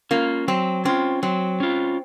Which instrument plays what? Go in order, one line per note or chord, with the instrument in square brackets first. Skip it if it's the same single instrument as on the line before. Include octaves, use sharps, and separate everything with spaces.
[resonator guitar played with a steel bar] A#3 [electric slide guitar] C#4 F4
[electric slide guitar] F#3 [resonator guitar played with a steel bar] C4
[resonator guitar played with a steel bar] C4 [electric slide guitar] C#4 F4
[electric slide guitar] F#3 [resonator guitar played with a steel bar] C4
[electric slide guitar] C#4 F4